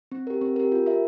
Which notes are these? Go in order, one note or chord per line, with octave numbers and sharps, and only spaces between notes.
C4
G4 A#4
C4
G4 A#4
F4
A#4 E5